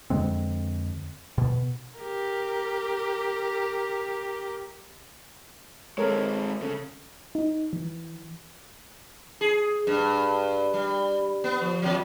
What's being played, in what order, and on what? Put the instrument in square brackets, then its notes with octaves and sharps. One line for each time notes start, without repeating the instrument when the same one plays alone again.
[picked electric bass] F2 D3 G#3 C4
B2
[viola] G4 A#4
[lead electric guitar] G#3 C4 [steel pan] A4 A#4 C#5
[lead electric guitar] C#3 [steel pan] A4
[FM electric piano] D#4
E3
[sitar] G#4
G2
G3
B3
F3
E2 F#3